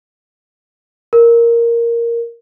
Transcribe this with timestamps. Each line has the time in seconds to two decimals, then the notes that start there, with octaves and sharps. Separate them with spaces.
1.13 A#4